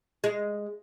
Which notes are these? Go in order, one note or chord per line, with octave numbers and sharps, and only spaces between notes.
G#3